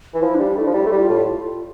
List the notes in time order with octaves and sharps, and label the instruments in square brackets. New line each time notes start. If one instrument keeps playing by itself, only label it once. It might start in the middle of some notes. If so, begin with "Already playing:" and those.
[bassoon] E3
[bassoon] F3 [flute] E4
[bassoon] G3 [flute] D4
[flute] E4
[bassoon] A3 [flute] D4
[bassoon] F3
[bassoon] G3 [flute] E4
[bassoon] A3
G3
[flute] F4
[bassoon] A2